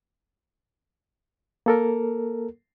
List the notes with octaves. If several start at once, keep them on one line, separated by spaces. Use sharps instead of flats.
A#3 A4 A#4